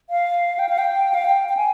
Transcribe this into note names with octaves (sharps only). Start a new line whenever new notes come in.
F5
G5
F5
G5
F5
G5
G5
G#5